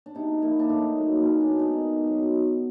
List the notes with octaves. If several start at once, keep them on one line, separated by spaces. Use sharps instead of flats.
D4
C3 D#4
F3 A#3 E4
D4
A2 D#4
F#3 A#3
B2 C#4
D4
G#3 B3
D#4
D#3
F#3 B3